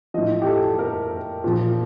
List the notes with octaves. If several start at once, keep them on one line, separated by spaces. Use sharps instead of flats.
A2 F3 D#5
G4
A4
A#4
A#2 F3